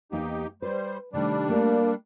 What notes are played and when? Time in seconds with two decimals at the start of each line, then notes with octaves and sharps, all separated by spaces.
0.12 E2 A#3 D#4 G4 F5
0.62 G3 B4 C5
1.13 C3 D#3 G3 A3 D4
1.49 A3 A#3 A#4